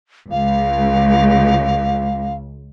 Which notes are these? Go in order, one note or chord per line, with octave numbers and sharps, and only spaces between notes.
C#2 F5